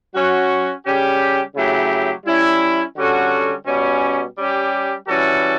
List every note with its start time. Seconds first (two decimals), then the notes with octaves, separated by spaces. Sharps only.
0.14 F#3 C#4 F#4
0.85 C#3 G3 C#4 G4
1.55 C#3 F#3 A3 E4 G4
2.25 G3 C#4 E4
2.96 D3 G3 C#4 F#4 A4
3.66 B2 G3 C#4
4.37 G3 C#4 G4
5.07 E3 G3 C#4 F#4 A4